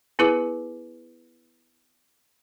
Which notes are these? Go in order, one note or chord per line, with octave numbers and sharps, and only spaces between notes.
B3 E4 G#4 B4 D6